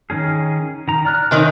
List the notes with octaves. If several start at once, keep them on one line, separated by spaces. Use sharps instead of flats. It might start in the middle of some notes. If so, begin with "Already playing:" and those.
D#3 C#4 G#4
D#3 A#5
D5 F6 F#6
C3 D#3 D#4 C#5 G#5 C#6